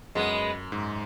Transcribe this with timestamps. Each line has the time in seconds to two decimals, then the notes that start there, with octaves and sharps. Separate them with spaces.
0.15 F#2 G#3 B3
0.72 G#2